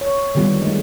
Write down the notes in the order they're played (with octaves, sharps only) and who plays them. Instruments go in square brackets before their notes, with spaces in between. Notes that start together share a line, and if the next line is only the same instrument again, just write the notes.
[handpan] C#5
D3 D#3 G3 B3 F4
G#3 A3 D#4